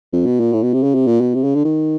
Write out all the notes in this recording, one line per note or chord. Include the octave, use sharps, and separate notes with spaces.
F2
B2
A#2
A2
B2
C3
C#3
C3
A#2
B2
C3
C#3
D3
D#3